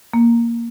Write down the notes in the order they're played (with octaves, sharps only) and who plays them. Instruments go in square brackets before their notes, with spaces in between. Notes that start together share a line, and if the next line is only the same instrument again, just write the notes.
[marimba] A#3